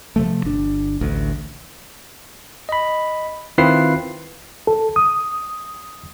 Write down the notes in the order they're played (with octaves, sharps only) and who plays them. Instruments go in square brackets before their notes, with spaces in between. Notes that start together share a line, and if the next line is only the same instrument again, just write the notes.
[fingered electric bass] C3 F3 A3
G1 D4
A1 D2
[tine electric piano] D#5 B5
D#3 C4 E4 F4 B4 C7
[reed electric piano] A4
D#6